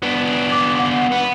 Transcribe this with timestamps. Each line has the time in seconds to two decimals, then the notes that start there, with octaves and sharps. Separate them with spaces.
0.03 B3 D4
0.51 D6
0.78 F#5
1.12 B3